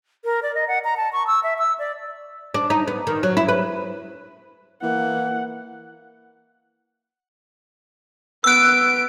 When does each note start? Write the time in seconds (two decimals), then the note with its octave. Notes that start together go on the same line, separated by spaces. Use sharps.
0.25 A#4
0.43 D5
0.55 D#5
0.68 F#5
0.84 A#5
0.97 A5
1.13 C#6
1.27 E6
1.43 E5
1.59 E6
1.79 D5
2.54 D4
2.70 D#4
2.88 B3
3.07 D#3
3.23 F#3
3.37 E4
3.48 B4
4.83 E3 A#3 F#5
8.44 B3 E6 F#6 D7